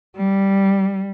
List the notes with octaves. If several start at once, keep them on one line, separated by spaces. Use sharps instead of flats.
G3